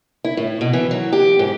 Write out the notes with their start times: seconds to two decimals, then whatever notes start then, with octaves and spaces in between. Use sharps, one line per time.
0.25 E4
0.37 A2
0.61 B2
0.73 E3
0.91 F#3
1.13 G4
1.39 G#2